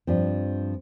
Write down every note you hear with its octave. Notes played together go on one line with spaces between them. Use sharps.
G2 F3 C4